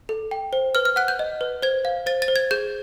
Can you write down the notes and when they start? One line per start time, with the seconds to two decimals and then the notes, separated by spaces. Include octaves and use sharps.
0.09 A4
0.31 G5
0.53 C5
0.75 B4 F6
0.85 F6
0.96 F#5 F#6
1.08 G6
1.19 D#5
1.41 B4
1.62 C5 G#6
1.85 F5
2.06 C5 A6
2.22 A6
2.28 C5
2.36 G#6
2.51 G#4 G6